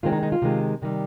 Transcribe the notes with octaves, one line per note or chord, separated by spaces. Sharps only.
C3 D#3 G#3 C4 F4
D#4
D#4
F4
C3 D#3 G#3
C3 D#3 G3